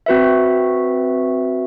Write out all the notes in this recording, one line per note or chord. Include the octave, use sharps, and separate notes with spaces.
C4 F#4 B4 E5